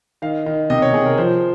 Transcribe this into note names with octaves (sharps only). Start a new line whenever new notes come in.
D#3 F5
D#3
C3 D#5
C#5
C3 G#4
A#4
F3 C5